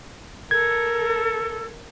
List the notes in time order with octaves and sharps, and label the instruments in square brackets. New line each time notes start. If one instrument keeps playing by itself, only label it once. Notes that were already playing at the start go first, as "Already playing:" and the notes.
[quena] A4 [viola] A#4 [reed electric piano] G#6